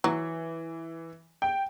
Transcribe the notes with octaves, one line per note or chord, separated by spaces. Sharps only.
E3 F#3
G5